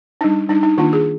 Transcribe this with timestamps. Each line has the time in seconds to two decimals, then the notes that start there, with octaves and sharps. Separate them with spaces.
0.21 G3 D4 D#4
0.49 G3 D4 D#4
0.63 D#4
0.78 D#3 A#3 D4 F4
0.93 G#4